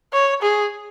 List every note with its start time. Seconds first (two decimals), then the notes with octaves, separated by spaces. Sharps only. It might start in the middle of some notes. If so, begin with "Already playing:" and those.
0.13 C#5
0.42 G#4